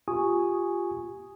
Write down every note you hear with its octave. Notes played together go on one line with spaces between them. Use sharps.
F4 G4 G#5 C#6 D#6